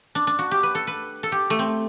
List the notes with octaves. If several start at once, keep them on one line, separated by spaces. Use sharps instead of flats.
D4
D4
F#4
G4
B4
A4
B4
A4
G4
A3
C4